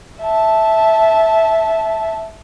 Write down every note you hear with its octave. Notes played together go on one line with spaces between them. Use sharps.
E5 A5